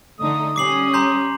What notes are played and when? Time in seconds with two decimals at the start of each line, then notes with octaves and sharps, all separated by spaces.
0.20 D3 A3 D#4 D#6
0.56 G3 C#4 D6 C7 F#7
0.94 A#5 C6 G6